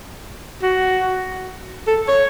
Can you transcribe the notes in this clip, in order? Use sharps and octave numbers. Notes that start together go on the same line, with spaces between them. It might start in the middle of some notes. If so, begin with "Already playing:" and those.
F#4
A4
C#5